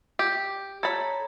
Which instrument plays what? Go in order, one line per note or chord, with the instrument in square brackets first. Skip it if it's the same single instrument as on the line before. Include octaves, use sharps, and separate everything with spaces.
[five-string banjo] G4
[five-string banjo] A4 B5 [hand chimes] C#5 A#5 G#6